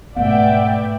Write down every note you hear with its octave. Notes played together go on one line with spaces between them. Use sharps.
G#2 B2 A3 B3 D5 E5 F#5 G5